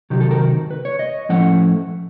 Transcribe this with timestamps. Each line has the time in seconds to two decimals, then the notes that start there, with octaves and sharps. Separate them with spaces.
0.10 C3 D#3 F#3 G4
0.20 A4
0.31 A#4
0.71 B4
0.85 C#5
0.99 D#5
1.29 A2 F3 A3 C#4 F#5